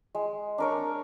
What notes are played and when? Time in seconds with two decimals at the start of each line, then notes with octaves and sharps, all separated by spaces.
0.15 G#3
0.58 D4 A#4 C#5